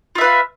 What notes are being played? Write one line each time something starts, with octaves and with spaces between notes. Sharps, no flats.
F4 B4 E5 F5